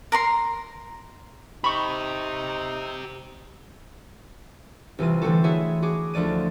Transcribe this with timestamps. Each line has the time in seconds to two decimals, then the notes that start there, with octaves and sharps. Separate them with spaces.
0.12 A#4 A#5 C6
1.64 D#4 G4 C5 B5 C#6
4.99 C2 E3 F4 D#7
5.22 D3 E3 A3 C4 F#4 A4
5.44 E4 F#4 G#4 C#5 E5
5.82 F#4 G#4 D6
6.14 D2 F3 A3 D5 D#7